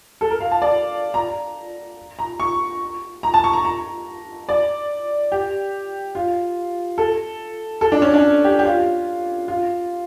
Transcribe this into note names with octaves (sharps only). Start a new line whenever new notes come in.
A4
A#4
F5
A5
D5
A#5
A#5
C#6
A#5
A5
C#6
A#5
A#5
D5
G4
F4
A4
A4
D4
C#4
D4
G4
G4
F4
F4